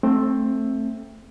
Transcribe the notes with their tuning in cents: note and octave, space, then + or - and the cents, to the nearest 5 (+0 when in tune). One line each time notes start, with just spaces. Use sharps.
A3 +0 C4 +15